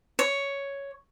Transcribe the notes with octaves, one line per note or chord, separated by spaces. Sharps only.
C#5